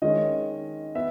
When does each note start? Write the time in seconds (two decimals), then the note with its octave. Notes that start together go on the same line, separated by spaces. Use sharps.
0.02 D#3 G#3 C#4 D#5
0.95 B3 E5